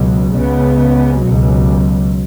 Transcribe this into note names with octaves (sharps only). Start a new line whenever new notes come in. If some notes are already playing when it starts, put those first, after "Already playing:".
Already playing: C#2 B2 F#3
C#2 C#3 B3
C#2 B2 F#3